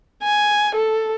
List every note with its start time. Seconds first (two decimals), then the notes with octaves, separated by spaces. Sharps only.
0.23 G#5
0.75 A4